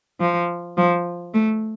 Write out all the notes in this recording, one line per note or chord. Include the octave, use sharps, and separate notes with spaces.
F3
F3
A3